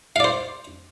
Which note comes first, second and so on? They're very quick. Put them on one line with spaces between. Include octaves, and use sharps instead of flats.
F5 D5 C5